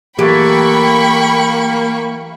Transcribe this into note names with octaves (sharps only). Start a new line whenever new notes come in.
E3 F#3 A3 A#3 G4 G5 B5 C#6